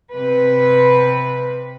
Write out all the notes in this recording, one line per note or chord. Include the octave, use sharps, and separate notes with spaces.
C3 B4